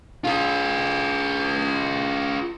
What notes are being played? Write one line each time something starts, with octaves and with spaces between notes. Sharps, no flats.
F4 G#4